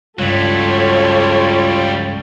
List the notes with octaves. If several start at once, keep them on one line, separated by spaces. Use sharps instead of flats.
C#2 G2 F#3 G3 F4 A4 C#5